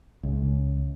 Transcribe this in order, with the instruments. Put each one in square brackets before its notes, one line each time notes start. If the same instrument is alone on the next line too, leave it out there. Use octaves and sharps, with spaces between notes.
[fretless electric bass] C#2